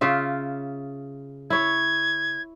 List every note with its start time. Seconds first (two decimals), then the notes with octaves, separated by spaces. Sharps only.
0.01 C#3 F4 E5
1.50 E4 C#5 G#6